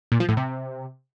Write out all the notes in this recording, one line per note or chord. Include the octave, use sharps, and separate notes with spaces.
A#2
F3
A2
C3